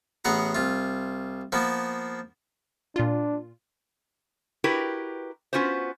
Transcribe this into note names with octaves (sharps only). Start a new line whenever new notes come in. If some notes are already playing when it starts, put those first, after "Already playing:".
A1 B3 G#4 F#5 A#5
C2 F4
F3 A#3 B3
A#2 D4 F4
E4 F#4 G4 A#4 B4
B3 C#4 F4 F#4 C5